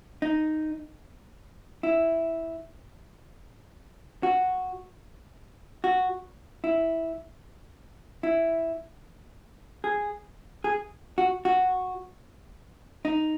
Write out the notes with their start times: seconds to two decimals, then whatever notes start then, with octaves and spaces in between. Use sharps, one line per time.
0.22 D#4
1.83 E4
4.23 F#4
5.84 F#4
6.64 E4
8.23 E4
9.84 G#4
10.64 G#4
11.18 F#4
11.45 F#4
13.05 D#4